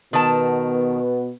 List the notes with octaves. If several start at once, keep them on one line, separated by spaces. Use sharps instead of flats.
B2 D#3 B3 A5